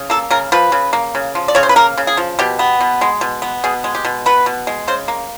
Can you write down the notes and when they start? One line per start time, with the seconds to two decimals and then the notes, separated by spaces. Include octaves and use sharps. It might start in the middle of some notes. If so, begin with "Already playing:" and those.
Already playing: C#3
0.10 A#3 A4
0.31 C#3 A#4
0.52 F3 B4
0.72 C#3
0.93 A#3
1.15 C#3
1.35 F3
1.48 D5
1.55 C#3 C#5
1.63 C5
1.69 B4
1.76 A#3 A#4
1.98 C#3
2.07 G#4
2.17 F3
2.39 B2 G4
2.59 B3
2.81 B2
3.01 G#3
3.21 B2
3.42 B3
3.64 B2 G#4
3.84 G#3
3.95 G4
4.05 B2
4.26 B3 B4
4.46 B2
4.67 G#3
4.88 C#3 C5
5.08 A#3